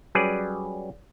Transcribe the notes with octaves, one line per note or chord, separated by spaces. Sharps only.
F#3 G3 C#4 G#4 B4 D5